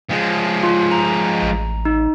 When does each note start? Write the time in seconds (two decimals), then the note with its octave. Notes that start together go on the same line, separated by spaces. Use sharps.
0.10 F3 G#3
0.63 F4
0.92 A#5
1.42 A1
1.85 D#4